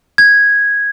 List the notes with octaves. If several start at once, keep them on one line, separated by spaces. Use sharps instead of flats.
G#6